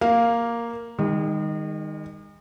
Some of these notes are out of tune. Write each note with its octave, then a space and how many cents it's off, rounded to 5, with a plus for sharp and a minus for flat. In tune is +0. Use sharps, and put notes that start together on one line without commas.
A#3 +0 F5 +0
D#3 +0 G#3 -45